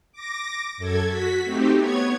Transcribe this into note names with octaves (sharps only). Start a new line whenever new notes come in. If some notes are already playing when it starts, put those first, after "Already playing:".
D6 A#6
F#2 A4 G#6
F#4 B6
A3 C4 D#4 G4
B3 C#5 G#6